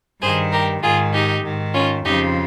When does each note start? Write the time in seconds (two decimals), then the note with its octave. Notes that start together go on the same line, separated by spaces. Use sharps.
0.21 G2 D#3 G#4 C5
0.52 G4 A#4
0.82 G#2 D#3 F4 G#4
1.13 D#4 G4
1.43 G#2 D#3
1.73 C#4 F4
2.04 F2 C#3 F3 D#4 G4